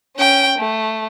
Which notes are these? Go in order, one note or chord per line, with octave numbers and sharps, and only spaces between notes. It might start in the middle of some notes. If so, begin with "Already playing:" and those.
C#4 G5
A3